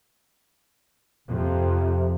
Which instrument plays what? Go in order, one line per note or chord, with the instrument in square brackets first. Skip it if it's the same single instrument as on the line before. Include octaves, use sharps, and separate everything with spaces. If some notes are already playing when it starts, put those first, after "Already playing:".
[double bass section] F2 [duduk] C3